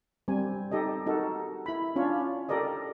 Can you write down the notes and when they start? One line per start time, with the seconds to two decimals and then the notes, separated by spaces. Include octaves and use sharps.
0.28 G3 C4 G#5
0.72 D#4 G4 A4 D#5
1.07 D#4 F#4 A4 A#4
1.66 E4 B5
1.96 C#4 D4 F4 C#5
2.49 G4 A4 A#4 D5 D#5